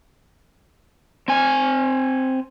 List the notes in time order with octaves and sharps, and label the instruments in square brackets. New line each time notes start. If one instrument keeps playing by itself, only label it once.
[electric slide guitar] C4 G#5